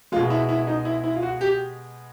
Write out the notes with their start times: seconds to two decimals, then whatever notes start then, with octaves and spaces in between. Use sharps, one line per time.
0.12 G#3 F4
0.16 B2
0.30 E4
0.49 E4
0.67 D#4
0.85 E4
1.04 E4
1.15 F4
1.23 F#4
1.41 G4